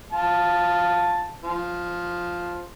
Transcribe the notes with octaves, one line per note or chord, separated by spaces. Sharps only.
F4 A5
F3